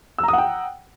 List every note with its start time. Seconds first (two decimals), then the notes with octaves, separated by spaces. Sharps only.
0.19 E6
0.23 A#5
0.28 D#6
0.33 F#5
0.38 G5